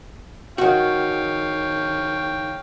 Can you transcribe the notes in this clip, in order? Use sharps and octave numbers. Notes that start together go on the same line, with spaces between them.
D#3 F#4 C#5 F5 G5